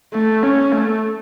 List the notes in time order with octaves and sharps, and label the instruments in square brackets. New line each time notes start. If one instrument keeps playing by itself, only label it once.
[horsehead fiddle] A3
C#4
A3